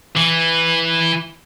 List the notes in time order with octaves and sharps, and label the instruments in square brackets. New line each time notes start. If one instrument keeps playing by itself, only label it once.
[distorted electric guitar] E3